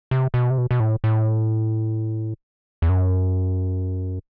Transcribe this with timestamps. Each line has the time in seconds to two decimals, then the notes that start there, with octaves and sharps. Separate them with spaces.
0.11 C3
0.34 B2
0.50 C3
0.58 B2
0.71 B2
0.80 A2
1.04 A2
2.82 E2
2.89 F#2